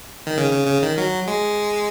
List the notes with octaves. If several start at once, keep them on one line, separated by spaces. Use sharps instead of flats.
D#3
C#3
C#3
C#3
D#3
F#3
G#3